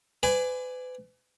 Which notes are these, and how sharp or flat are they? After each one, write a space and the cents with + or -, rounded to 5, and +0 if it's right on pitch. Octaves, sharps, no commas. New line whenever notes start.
B4 +40 D5 +0 G#5 +0